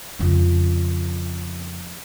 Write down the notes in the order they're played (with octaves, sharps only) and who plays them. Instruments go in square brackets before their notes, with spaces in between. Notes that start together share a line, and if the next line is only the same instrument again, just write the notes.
[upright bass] F2 C#3